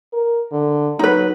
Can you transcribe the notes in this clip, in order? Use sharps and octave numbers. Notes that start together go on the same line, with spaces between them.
A#4
D3
F#3 D#4 B4